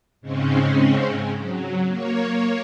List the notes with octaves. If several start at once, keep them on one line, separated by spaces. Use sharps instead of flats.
G#2 C#3 G#3 C4 C#4
F#3
A#3 C#5